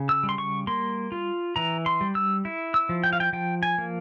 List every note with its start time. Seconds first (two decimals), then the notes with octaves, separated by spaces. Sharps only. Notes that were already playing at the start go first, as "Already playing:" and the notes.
Already playing: C#3
0.09 E6
0.23 G3
0.29 C6
0.38 C#6
0.67 A#3 C6
1.12 F4
1.56 E3 A#5
1.86 C6
2.01 G3
2.15 E6
2.45 E4
2.74 E6
2.89 F3
3.04 G5
3.13 F5
3.20 G5
3.33 F3 G5
3.63 G#5
3.78 A#3